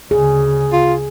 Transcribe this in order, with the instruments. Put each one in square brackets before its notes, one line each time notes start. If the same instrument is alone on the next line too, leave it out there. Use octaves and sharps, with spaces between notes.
[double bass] D2 C#3 [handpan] G#4
[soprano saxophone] F4